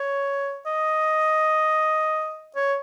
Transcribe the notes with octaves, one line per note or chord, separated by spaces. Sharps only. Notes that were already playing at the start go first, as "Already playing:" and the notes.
Already playing: C#5
D#5
C#5